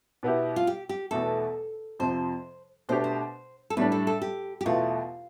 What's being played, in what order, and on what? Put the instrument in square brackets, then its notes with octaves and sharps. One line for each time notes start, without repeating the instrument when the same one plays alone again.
[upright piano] B2 B3 E4 G4
[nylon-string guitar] F4
G4
G4
[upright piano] E2 B2 A3 [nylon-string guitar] A4
[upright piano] F2 C3 F3 [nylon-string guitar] C5
[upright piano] B2 A3 D4 G4 [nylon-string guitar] C5
[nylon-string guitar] C5
A4
[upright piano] A2 G3 D4 [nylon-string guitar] B4
[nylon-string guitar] A4
A4
G4
G4
[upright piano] E2 B2 A3 [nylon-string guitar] F4